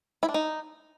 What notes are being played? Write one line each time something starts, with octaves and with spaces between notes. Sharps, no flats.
E4
D4
D#4